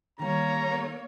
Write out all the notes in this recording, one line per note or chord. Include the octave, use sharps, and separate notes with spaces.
D#3 G3 A#3 C#5 A#5